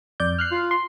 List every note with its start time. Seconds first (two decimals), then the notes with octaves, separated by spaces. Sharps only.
0.20 F2 D5 G6
0.39 F6 F#6 C7
0.52 F4
0.71 C6